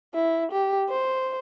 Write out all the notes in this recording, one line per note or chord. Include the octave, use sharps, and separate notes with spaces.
E4
G4
C5